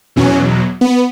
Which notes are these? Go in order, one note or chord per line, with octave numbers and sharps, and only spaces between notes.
E2 B2 F#3 C#4
B3